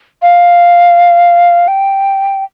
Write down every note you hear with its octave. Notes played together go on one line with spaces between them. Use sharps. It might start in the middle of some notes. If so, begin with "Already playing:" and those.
F5
G5